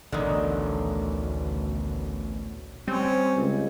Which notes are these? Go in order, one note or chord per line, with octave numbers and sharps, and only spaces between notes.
A1 D2 B2 D3 D#3
G3 C4 C#4
C#2